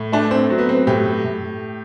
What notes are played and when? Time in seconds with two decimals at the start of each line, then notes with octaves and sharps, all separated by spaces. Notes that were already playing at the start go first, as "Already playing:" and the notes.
Already playing: A2
0.12 A3 D4
0.31 C4
0.50 F#3
0.58 B3
0.69 C4
0.87 A2 G4
1.24 A2